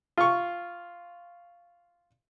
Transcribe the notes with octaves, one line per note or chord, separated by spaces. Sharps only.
F4 C#6